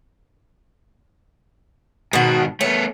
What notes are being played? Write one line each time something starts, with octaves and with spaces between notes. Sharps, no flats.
G#2 B2 D#3 F#4
A3 B3 C#5